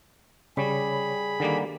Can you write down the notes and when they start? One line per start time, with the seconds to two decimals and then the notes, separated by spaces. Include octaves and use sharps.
0.57 C#3 G3 G#4 C#5 B5
1.40 D3 D#3 G3 A#3